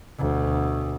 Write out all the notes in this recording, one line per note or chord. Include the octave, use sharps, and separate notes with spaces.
D2 B2